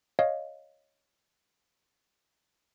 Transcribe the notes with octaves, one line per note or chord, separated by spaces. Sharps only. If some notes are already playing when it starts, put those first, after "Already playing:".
C#5 D#5 F5